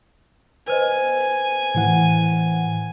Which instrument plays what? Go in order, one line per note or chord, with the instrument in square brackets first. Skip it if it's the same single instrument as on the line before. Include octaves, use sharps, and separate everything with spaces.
[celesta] B4 C5 D#5 [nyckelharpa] G#5
[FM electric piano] A2 E3 F#5